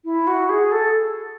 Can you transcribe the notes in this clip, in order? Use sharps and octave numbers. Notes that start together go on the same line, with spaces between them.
E4
F#4
G#4
A4